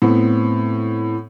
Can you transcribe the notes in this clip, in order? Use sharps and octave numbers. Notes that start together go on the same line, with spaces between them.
A2 B3 C4